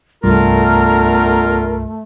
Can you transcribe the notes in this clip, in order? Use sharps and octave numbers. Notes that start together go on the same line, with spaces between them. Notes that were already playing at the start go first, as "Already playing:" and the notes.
C2 G2 D3 A3 B3 F4 A#4